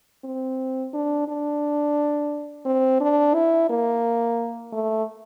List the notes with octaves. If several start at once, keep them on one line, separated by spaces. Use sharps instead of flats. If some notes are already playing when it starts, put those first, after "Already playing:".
C4
D4
D4
C4
D4
E4
A#3
A3